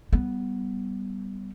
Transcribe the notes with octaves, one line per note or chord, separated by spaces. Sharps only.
G3 B3